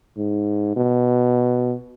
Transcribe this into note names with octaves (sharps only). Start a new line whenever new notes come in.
G#2
B2